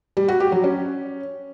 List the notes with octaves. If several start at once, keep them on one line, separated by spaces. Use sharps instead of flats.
G3
F#4
G4
F#3
C#4